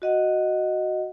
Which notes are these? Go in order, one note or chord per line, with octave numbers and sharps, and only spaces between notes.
F#4 D#5 F#5